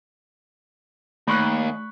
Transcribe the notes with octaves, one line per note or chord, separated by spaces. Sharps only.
D#2 A3 B5 C#6 F#6